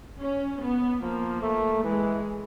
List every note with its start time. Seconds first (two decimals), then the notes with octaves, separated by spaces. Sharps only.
0.20 C#4
0.61 B3
1.02 F3 A#3
1.42 A3
1.83 E3 G#3